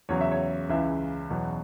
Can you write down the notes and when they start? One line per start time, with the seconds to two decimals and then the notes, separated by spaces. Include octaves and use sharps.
0.09 E2 C#3 F#3 C#5
0.21 E5
0.32 C#5
0.69 C#2 C#3 E3 E5
1.30 E2 B2 F#3